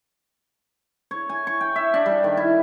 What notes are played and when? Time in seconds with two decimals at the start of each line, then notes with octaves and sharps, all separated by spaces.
1.11 C#5
1.29 G#5
1.47 C#6
1.61 G5
1.76 E5
1.94 D4
2.06 G3
2.24 D#3
2.37 E4